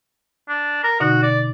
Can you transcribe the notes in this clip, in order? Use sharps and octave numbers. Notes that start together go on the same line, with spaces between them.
D4
A#4
B2 D3 D#4 F#4
D5